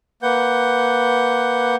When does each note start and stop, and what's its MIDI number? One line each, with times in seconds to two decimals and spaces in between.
0.23 1.76 58
0.23 1.76 71
0.23 1.76 78
0.23 1.76 91